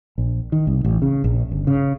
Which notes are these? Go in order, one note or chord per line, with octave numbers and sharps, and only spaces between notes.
A#1
D#3
C2
A1
C#3
A#1
G1
C#3